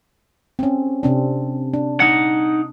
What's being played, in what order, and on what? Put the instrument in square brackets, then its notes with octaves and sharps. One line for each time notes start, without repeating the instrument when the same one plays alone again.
[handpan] C4 C#4
C3 C4 D4
D4
[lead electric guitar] D#4 F#5